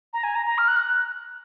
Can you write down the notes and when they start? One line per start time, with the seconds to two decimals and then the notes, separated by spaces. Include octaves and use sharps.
0.13 A#5
0.23 G#5
0.35 A#5
0.46 A#5
0.58 F6
0.68 F#6
0.76 F6
0.80 F#6